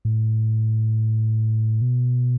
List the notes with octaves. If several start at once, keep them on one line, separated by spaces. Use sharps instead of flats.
A2
B2